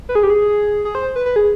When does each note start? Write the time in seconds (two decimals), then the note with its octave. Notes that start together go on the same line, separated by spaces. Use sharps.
0.09 B4
0.15 G#4
0.23 G4
0.30 G#4
0.85 G#4
0.95 C5
1.16 B4
1.26 B4
1.36 G#4